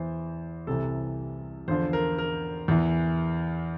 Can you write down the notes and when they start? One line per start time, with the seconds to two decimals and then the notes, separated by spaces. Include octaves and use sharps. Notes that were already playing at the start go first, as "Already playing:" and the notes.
Already playing: E2 E3 C5
0.67 C2 C3 E3 A4
1.68 E2 D3 F3 C5
1.93 A#4
2.18 A#4
2.68 E2 E3